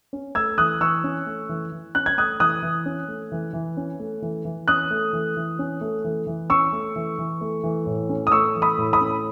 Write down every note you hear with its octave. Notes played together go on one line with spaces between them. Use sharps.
C#4
A3 E6 G#6
E3 D#6 F#6
E3 C#6 E6
C#4
A3
E3
E3
C#4 F#6
G#6
A3 D#6 F#6
E3 D#6 F#6
E3
C#4
A3
E3
E3
C#4
A3
E3
E3
C#4 D#6 F#6
A3
E3
E3
C#4
A3
E3
E3
C#4 C#6 E6
A3
E3
E3
A3
E3
A2
C#4
D#6
A3 C#6 E6
E3
B5 D#6
A2
B5 D#6
C#4